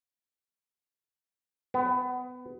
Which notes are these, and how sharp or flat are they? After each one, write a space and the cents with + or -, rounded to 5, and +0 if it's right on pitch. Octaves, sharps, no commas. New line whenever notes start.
B3 +25